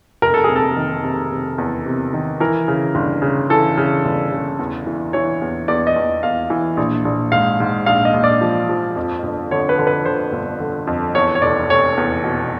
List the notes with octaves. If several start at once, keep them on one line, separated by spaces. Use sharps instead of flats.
F1 A#4
A4
C3 G#4
A4
D#3
C3
C3
E2
C3
D#3
E3 A#4
C#3
G1
C#3
E3 A4
C#3
G1
C#3
E2
E3
E3 C#5
E2
E2 D5
D#5
E2
E2 F5
E3
A#1
A#1
G#2 F5
G#2
A#1 F5
D#5
A#1
D5
F3
F3
F2
G1
D3 C#5
B4
D3
B4
D3 C5
G1
D3
F2
E2 C#5
C#5
F1 D5
F1 C#5
E2
B2